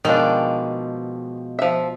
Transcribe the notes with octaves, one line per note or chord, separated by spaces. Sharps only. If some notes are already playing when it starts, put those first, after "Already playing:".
B2 D#3 F3 G#3 D4
F3 E5